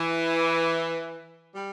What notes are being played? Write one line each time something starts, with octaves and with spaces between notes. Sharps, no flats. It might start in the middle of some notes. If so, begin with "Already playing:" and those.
Already playing: E3
G3